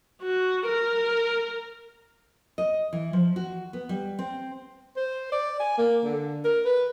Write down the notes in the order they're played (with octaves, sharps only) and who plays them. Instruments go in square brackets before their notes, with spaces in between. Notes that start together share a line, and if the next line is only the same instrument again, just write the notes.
[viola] F#4
A#4
[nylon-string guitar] D#5
E3
F3
F#4
B3
G3
C4
[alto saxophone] C5
D5
G#5
A#3
D3
A#4
B4